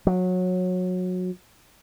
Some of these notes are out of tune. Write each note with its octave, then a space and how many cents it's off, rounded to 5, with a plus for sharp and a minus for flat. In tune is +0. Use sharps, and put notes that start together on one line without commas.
F#3 -20